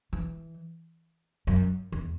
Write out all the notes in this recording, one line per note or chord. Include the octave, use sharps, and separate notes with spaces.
E3
F#2
E2